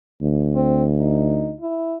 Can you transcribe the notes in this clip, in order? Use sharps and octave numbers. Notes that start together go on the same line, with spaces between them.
D2
C4
D#4
E4